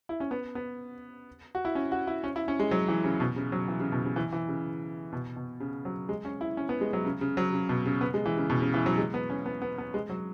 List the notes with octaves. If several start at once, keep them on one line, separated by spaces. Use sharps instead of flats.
E4
C#4
B3
B3
F#4
E4
C#4
F#4
E4
C#4
E4
C#4
G#3
F#3
E3
C#3
B2
C#3
F#3
E3
C#3
B2
C#3
E3
E3
C#3
B2
B2
C#3
F#3
G#3
C#4
E4
C#4
B3
G#3
F#3
C#3
C#3
F#3
C#3
B2
C#3
B3
G#3
E3
C#3
B2
C#3
E3
F#3
G#3
B3
C#4
B3
B3
B3
G#3
F#3